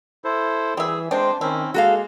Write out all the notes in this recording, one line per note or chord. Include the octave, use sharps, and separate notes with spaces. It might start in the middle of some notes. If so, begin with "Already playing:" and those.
E4 A4 C5
E3 G3 G#4 E5
C3 G#3 D4 C5 G5
D#3 C4 C#4 E4
G#3 A#3 F#4 A4 F5